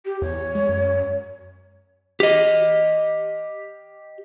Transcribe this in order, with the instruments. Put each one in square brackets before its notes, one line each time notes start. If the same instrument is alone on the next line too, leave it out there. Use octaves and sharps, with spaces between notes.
[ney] G4
[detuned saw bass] E2 [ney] C#5
[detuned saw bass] G#3
F#2
[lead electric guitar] G4 D#5